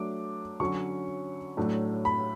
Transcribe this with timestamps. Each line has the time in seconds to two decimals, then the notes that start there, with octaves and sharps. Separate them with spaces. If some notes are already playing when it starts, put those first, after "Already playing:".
Already playing: F#3 A3 D4 D6
0.60 D3 F#3 C#4 C#6
1.57 A2 F#3 A3 D4
2.05 B5